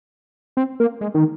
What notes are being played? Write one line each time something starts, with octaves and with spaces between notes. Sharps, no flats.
C4
A#3
G#3
D#3